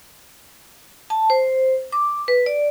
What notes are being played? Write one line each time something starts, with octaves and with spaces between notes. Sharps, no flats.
A5
C5
D6
B4
D5